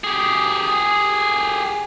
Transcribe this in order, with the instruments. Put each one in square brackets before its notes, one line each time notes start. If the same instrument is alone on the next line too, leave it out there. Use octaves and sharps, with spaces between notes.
[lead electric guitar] G4 G#4